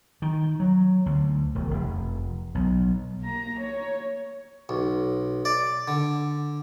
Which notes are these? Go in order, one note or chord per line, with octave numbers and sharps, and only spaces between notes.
D#3
F#3
D2
E1
F1
B1
A#3 A#5
C#5
B1
D5
D3